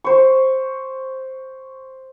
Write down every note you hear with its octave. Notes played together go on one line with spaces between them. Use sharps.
C5 C#6